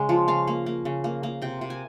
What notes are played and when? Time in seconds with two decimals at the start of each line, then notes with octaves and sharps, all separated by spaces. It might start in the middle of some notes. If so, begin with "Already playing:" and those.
Already playing: C#3 G#3
0.09 F3
0.28 C#3 F5
0.48 A#3
0.66 A#3
0.85 C#3
1.04 A#3
1.23 A#3
1.42 C3 G5
1.61 C3
1.70 G#5